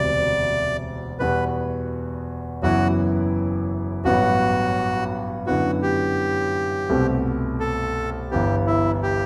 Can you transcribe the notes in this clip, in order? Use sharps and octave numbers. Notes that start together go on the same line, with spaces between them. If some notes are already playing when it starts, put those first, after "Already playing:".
Already playing: E1 D2 C3 G3 D5
E2 B2 G3 B3 F#4 B4
F#1 F#2 E3 B3 E4 F#4
A1 G2 F#3 B3 F#4
F#2 D3 F#3 B3 E4 F#4
G4
C2 B2 A3 C4
A4
G1 G2 E3 B3 G4
E4
G4